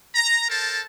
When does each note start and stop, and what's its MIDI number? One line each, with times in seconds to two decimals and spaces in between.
0.15 0.44 82
0.49 0.83 69
0.49 0.83 70
0.49 0.83 72
0.49 0.83 81